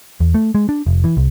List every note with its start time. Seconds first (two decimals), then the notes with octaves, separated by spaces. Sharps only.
0.20 E2
0.34 A3
0.55 G#3
0.69 D4
0.86 F1
1.04 E3
1.17 C2